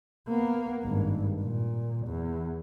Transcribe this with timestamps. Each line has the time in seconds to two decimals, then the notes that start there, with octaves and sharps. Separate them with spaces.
0.28 A#3 B3
0.83 G#1 G2
1.42 A#2
2.06 E2